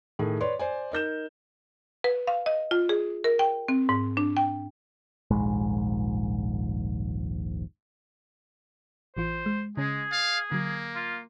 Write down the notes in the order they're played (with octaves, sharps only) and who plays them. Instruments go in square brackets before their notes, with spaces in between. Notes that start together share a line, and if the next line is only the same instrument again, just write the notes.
[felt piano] A2 D#3 G#4
B4 C#5 D5 C6
C5 D5 G#5
D#4 A#4 G6 E7
[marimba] B4
F5
D#5
F4
G#4
A#4
G5
C4
G#2
D4
G5
[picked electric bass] D#1 A#1 G#2 G#3
[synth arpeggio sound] A1 E3 F4 [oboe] C5
[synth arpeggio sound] G#3
[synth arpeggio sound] C#3 C#4 [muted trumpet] G#3 [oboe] G#4
[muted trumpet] F5 [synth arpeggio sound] A6
[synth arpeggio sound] D3 F#3 [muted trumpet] A#3
[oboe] F4